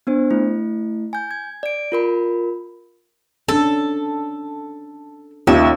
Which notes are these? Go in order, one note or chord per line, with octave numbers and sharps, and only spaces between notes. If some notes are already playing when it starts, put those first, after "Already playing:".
B3 D4 C5
A3 E4
G#5 G6
G#6
D5 D7
F4 A#4 B5
C#4 D4 A4
D#2 C#4 D#4 F4 E5